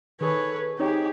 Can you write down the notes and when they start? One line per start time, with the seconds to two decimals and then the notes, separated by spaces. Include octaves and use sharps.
0.21 D#3 G#4 A4 B4 C#5
0.79 C4 D#4 G4 G#4 C#5